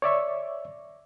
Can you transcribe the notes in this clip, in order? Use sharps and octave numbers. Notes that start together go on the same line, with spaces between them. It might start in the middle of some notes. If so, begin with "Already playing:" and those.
C#5 D5 E5 C#6